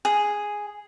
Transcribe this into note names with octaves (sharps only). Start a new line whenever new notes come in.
G#4